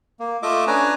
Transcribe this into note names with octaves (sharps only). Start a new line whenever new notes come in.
A#3
A3 F4 D#5 E5 D6
C#4 D4 B4 G#5 A#5